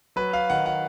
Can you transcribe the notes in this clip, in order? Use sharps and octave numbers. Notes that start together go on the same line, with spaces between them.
F#3 B4
F5
D#3 F#5
F#5